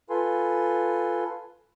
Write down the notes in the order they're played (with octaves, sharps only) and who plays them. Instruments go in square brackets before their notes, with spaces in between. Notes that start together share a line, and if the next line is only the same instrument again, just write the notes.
[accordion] F4 A4 B4 G#5 C6